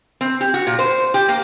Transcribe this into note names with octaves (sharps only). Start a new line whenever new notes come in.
C4
G4
F#4
A#2
C5
G4
A#3